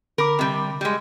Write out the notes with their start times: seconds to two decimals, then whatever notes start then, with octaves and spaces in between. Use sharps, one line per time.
0.18 D3 A#4 B5 D6
0.39 C3 G3
0.81 G3 G#3